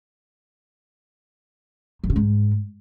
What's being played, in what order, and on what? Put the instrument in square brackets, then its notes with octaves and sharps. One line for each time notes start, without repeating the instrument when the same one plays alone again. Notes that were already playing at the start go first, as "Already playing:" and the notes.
[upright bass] F#2
C#3
G#2